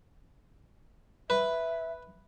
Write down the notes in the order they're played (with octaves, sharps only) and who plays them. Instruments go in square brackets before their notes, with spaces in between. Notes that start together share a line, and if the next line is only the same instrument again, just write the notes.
[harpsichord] B4 [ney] E5